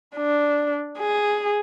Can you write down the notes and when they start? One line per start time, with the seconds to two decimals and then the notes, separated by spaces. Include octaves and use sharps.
0.16 D4
0.99 G#4